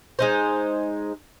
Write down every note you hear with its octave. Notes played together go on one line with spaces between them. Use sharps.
G#3 D#4 C5